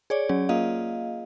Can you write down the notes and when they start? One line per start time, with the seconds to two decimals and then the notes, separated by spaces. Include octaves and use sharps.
0.10 G#4 C#5 D5
0.29 F#3 C#4 G#4
0.49 A#3 F4 G#4 D#5 F5